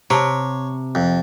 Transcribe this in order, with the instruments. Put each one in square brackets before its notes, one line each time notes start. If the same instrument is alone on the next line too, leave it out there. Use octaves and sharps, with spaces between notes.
[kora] C3 [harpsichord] C#5 [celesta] A5 A#5
[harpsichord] F2